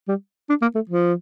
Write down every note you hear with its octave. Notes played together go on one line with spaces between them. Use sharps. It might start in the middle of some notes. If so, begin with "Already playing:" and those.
G3
D4
A#3
A3
F3